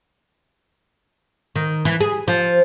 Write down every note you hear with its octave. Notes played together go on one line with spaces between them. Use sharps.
D#3
E3
G#4
F3